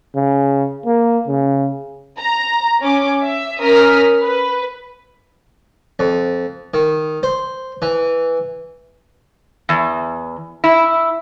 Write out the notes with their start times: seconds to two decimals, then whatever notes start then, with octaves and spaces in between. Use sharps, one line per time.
0.15 C#3
0.86 A#3
1.28 C#3
2.18 A#5
2.81 C#4 D6
3.24 E5
3.59 C#4 A#4 D#6 F6 B6
4.22 B4
5.99 F2
6.74 D#3
7.23 C5
7.82 E3
9.69 E2
10.64 E4